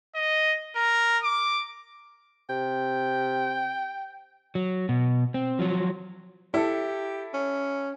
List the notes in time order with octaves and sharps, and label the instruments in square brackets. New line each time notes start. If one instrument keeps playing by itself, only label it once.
[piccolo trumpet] D#5
A#4
D6
[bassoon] C3 [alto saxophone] G5
[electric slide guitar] F#3
B2
C4
F3 F#3
[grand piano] E4 A4 [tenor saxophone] G4
[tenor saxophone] C#4